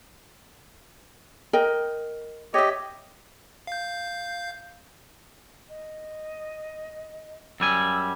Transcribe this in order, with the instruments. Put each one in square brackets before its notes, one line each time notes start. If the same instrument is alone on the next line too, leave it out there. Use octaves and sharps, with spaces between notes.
[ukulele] A#4 D#5 G5
[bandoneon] G4 D#5 [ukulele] C#5 E5
[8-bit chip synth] F5 G6
[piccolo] D#5
[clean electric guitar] F#2 G3 G#5 [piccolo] E6